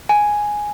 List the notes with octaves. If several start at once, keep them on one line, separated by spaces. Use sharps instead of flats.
G#5